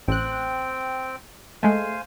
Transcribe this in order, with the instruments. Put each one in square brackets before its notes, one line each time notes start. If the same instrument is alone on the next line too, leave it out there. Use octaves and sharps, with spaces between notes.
[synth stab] A1 F#6 [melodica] C4 G5
[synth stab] G#3 A3 [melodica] C5 F5 G#5